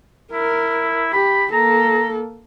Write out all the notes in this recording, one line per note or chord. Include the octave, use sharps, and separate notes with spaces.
E4 A#4
G4 B5
A#3 A4 A#5